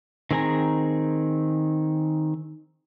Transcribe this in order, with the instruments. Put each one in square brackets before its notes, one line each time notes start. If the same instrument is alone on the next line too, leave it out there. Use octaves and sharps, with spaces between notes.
[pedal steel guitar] D#3 C4 G#4 G#5 A#5